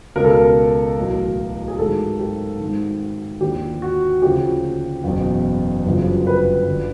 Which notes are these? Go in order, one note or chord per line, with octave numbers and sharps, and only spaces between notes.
C#2 B2 A#4
A4
A#4
B1 A2 E3
G#4
G#1 G#2 D#3 A4
G4
G#1 G#2 D#3
D#2 D3 F3 G4
F#4
D2 C#3 F3 G4
F#1 E2 B2
G1 F#2 C#3 F3
B4
G1 D3 F3